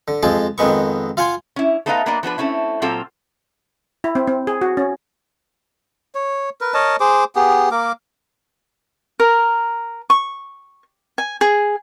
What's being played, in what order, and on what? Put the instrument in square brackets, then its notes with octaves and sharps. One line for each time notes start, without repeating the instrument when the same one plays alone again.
[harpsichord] D3
F2 F3 G#3 G#4 A5
F2 D#3 G#3 B3 C#6
F4 F5 F#5 G#5 C6
[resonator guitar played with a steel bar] C#4 E4
A3 B3 D#4 B4 D#5 F5
F#3 A#3 B3 D4 D5 D#5
F3 B3 D4 B4
A3 C4 C#4 E4
A#2 F#3 C4 F4 A4 F5
[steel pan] E4
C4
C4
G#4
F#4
C#4
[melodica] C#5
A#4 B4
A#4 C#5 D#5 A5
G#4 C5 D6
B3 G4 G#4
A#3 A#4 D6
[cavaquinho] A#4
C#6
G#5
G#4